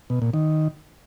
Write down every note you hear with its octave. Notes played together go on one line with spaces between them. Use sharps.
B2
A#2
D#3